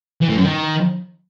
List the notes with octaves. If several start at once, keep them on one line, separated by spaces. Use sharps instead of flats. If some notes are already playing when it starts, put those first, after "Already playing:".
E3
A2
F#2
D#3